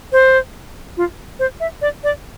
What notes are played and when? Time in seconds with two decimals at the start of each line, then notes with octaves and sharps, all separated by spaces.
0.12 C5
0.97 F4
1.39 C5
1.60 E5
1.82 D5
2.04 D5